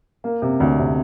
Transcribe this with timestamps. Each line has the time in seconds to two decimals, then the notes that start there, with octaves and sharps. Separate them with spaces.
0.24 A#3
0.42 C3
0.60 D2
0.79 C3